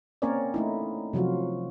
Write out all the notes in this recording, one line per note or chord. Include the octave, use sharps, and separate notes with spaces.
A#3 C4 C#4 A#4 C#5 D5
A3 D#4 E4
C3 F3 F#3 F4 F#4